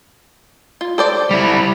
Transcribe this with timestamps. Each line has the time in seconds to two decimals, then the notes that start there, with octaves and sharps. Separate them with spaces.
0.81 F4
0.98 A4 C5 D5
1.31 G3 E4